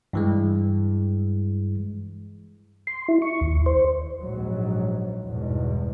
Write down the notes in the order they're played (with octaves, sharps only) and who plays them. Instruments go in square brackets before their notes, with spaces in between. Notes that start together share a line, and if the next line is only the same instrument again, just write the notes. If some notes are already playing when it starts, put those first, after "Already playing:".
[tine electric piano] G2 E3 G#3
[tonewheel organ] C6
E4
C#6
D#2
C5
[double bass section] A#1 G#2 F#3
G1 E2 G#2 B2